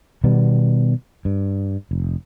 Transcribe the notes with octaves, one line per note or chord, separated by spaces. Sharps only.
B2 D#3 G3 B3
G2
F1